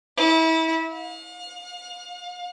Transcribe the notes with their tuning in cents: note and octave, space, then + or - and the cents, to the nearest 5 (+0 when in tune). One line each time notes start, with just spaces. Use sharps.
E4 -30
F5 +40